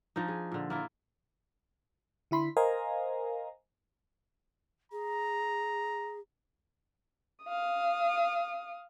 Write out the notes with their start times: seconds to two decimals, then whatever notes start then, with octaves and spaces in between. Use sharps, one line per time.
0.16 F3 D4 D#4
0.28 G#4
0.52 A#2 D3
0.70 A#3 E4 F4
2.31 D3 E4 B5 C6
2.57 A#4 C5 D#5 F5 G#5 A#5
4.92 G#4 A#5
7.44 F5 D#6